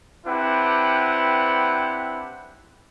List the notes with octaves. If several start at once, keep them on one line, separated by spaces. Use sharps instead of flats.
C4 D4 E4 G4 B4 F#5